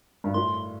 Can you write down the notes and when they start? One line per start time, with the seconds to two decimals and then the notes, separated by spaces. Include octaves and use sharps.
0.24 G2
0.34 A2 C6